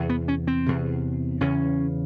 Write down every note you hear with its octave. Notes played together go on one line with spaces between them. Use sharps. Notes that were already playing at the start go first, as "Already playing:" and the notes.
Already playing: E2 C3
B3
C#4
C4
E2 C3
E2 C#3 C#4